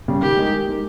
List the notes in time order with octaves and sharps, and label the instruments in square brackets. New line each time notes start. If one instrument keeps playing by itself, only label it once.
[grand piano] C#3 G3
[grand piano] D#3 [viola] G4
[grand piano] G#3 D#4 A#4
D#3
G#3 D#4 A#4